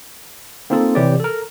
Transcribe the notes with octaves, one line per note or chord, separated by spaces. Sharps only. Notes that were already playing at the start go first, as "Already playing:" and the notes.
A#3 C4 D#4 F4 A4
C3 E3 G4 C#5 D5
A4 A#4